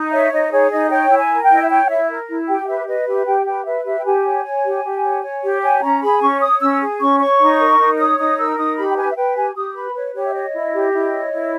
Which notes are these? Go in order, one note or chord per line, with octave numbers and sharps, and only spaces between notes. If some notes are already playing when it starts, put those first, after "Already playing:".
Already playing: D#4
C#5 E5
D#4 D#5
G#4 C#5
D#4 D#5
C#5 G5
E4
G#5
A#4
G5
E4 D#5
E5
C#5 G5
E4 E5
A#4
E4
G4 G5
B4 E5
B4 D#5
G4 E5
G4 G5
B4 G5
B4 E5
G4 E5
G5
G4 G#5
C#5
C#5
G4
G4
C#5
C#5
G4
C#5 G#5
C#4 A#5
G#4 B5
C#4 C#6
C#5 D#6
C#4 E6
G#4
C#4 C#6
C#5 C#6
D#4
A#4
D#4
C#5 D#6
D#4 D#6
A#4 E6
D#4 D#6
G4 B5
G5
B4 G#5
E5
B4 G5
G4 G#5
G4 D#6
B4 B5
B4 C#5
G4 C#5
E5
C#5 D#5
E4
G4
E4
C#5
E4